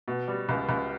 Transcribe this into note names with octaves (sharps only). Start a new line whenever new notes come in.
B2
G3
C#2
C#2